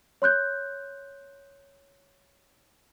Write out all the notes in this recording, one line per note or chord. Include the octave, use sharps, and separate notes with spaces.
C#5 C6 F#6 G6